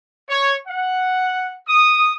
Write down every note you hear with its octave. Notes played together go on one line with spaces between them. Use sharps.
C#5
F#5
D#6